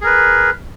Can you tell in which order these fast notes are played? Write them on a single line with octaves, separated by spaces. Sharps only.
G#4 A#4 B4